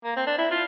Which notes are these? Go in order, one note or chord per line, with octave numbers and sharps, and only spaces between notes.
A#3
C4
D4
E4
F4